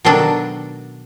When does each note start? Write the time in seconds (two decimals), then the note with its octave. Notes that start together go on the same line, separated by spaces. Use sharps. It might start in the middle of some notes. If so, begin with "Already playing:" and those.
0.05 B2 D#3 F#3 D4 A4